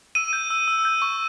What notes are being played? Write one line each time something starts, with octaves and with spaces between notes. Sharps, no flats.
E6 D#7
G6
E6
E6
G6
C#6